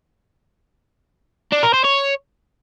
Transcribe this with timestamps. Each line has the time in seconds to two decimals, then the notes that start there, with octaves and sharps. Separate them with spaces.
1.52 D4
1.63 A#4
1.74 C5
1.85 C#5